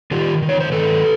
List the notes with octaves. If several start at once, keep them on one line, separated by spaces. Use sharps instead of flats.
D#3 F4 G4
D#3
C#5
C5
D#3 A4 B4